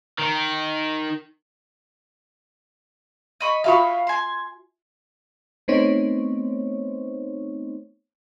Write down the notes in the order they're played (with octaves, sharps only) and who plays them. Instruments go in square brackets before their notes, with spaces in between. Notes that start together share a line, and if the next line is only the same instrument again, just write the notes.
[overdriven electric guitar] D#3
[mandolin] D#5 B5 C#6
[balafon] F4 F#4 E5 [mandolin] F5 B5 C#6
[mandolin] G#5 C6
[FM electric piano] A3 B3 C4 D#4 C5 C#5